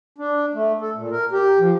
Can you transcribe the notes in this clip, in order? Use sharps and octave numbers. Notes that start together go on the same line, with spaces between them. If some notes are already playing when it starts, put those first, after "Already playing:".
D4
A3
A4
A#2
A#4
G4
F3